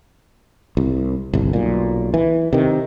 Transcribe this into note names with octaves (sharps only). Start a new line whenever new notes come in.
C2
G1 C2
B1 A#2
E3
C3 D#3